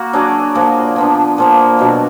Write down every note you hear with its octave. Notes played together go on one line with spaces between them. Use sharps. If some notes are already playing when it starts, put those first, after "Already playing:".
Already playing: A#3 F#4
F#3 D4 G#4 D5
A#2 F3 A#3
F3 B3 D4
A#2 F3 A#3
B2 F#3 D4